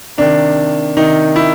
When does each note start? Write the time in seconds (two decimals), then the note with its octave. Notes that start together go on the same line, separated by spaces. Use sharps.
0.18 C3 D#3 D4
0.97 C3 D#3 D#4
1.36 E4